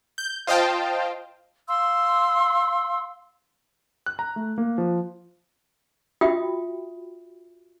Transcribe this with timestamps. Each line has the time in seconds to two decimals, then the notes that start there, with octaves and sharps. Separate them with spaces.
0.18 G6
0.47 F4 C5 D#5 F5 G5 A5
1.69 F5 C6 E6
4.06 F#6
4.19 A#5
4.36 A3
4.58 A#3
4.78 F3
6.21 F4 F#4 E5 G5 B5 D#6